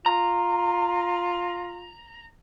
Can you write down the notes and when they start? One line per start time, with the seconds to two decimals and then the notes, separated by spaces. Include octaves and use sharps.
0.06 F4 A#5